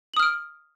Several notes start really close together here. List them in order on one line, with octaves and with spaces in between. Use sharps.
F#7 D#6 F6 D7